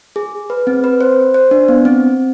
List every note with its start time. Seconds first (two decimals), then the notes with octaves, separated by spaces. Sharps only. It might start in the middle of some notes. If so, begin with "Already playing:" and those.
0.16 G#4
0.50 B4
0.67 C4
0.84 B4
1.01 C5
1.34 C5
1.51 D4
1.68 B3
1.85 C4